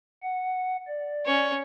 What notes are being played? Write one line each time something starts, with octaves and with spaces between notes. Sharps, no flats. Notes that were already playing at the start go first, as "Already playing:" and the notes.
F#5
D5
C#4 C#5